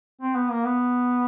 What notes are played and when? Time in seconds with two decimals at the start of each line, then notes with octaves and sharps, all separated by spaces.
0.22 C4
0.35 B3
0.50 A#3
0.64 B3